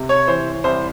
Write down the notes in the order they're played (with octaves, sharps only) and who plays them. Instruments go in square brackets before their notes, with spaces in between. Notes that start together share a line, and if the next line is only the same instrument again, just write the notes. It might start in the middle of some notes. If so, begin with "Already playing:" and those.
Already playing: [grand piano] C3
C#5
E3 C5
C2 C5